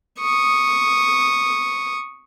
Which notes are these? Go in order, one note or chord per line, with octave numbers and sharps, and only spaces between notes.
C#6 D#6